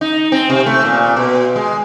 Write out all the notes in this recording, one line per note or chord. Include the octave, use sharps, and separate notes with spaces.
D#4
C4
C3
A3
A#2
B2
G#3